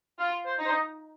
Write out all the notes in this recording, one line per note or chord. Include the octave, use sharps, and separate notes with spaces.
F4 F5
C5
D#4
C5
D#5